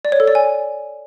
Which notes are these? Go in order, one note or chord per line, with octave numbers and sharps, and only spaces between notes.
D5
C#5
A4
D5
G#5